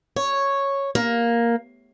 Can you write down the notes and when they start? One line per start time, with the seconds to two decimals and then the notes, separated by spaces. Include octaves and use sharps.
0.16 C#5
0.95 A#3